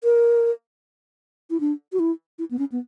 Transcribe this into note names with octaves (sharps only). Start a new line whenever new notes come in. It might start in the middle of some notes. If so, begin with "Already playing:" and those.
A#4
E4
D4
F#4
E4
E4
B3
C#4
B3